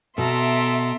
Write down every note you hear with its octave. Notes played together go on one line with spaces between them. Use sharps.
B2 A4 E5 A#5 C6 D7